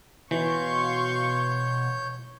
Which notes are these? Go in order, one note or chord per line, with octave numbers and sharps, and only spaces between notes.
B2 E3 C#5 F5 C6 C#6 G6